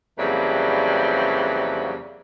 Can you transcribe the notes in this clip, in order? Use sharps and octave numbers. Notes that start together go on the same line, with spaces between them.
F2 C#3 E3 F#3 G3 A#3